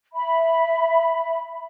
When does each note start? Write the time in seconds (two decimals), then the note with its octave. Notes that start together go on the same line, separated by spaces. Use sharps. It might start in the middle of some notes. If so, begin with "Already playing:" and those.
0.12 E5 B5